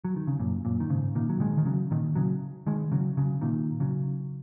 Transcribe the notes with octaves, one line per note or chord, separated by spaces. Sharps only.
F#3
D#3
C#3
F#2 A#2
F#2 A#2
D#3
G#2 C#3
A#2 D#3
F#3
D#3 G#3
D#3
C#3 F#3
A#2 D#3
C#3 F#3
D#3 G#3
C#3 F#3
C#3 F#3
A#2 D#3
C#3 F#3